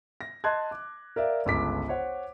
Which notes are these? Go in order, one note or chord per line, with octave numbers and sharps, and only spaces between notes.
A#6
D#5 A5 C6 F#6 G#6
D6
A#4 D5 E5 F5
G1 C#2 D6 B6
C5 C#5 F#5